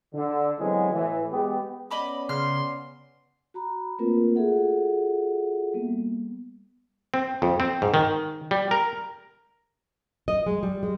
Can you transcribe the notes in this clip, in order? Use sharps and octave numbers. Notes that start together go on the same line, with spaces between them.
D3
D3 E3 F#3 G#3 B3 C4
A2 E3
G#3 B3 G4
B3 C#4 D5 D#5 B5 D6
C#3 C6 F6
F#4 A#5 B5
A3 A#3 C4 F4 A#4 B4
F4 F#4 G#4 A4 E5 F#5
G3 A#3 B3
C4
F2
C4
G#2
D#3
G3
A#4
D#5
G#3
G3
G#3